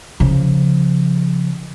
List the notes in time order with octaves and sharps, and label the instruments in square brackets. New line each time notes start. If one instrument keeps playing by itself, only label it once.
[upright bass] C#3 F3